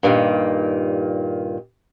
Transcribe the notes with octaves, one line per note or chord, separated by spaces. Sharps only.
G2 A#2 D3 D#3